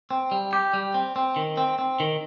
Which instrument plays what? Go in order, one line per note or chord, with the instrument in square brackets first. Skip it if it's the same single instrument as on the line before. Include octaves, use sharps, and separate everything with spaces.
[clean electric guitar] C4
G3
G4
G3
C4
C4
D#3
C4
C4
D#3